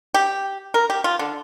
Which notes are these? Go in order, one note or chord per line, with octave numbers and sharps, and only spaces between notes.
G4
A#4
G4
F4
D3